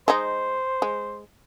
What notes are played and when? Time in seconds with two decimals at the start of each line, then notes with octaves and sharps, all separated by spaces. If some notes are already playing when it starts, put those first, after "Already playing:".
0.08 G#3 D#4 C5
0.82 G#3